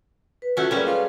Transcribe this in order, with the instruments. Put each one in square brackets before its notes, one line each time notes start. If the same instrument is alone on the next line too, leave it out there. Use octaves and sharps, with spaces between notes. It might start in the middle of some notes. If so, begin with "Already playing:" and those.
[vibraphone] B4
[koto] A3 C#4 [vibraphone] F4 [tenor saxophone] F#4
[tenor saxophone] A#2 [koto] F#3 G3 C#4 [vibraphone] G#4 B4
[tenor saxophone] F4